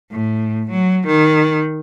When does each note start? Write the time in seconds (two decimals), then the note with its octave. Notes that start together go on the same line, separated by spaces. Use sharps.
0.11 A2
0.71 F#3
1.07 D#3